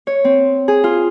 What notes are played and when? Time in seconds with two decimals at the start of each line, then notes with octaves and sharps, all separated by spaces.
0.07 C#5
0.25 C4
0.68 G#4
0.84 F4